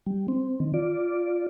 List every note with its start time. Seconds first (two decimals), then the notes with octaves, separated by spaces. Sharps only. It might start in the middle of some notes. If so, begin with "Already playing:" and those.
0.06 G3
0.28 C4
0.60 D#3
0.74 F4 D5